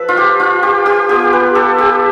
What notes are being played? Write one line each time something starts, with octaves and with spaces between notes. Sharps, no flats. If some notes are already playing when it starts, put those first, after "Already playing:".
Already playing: F3 A4 B4
F4
G4
F4
G4
G4
B3 F4 G4
B4
A4
G4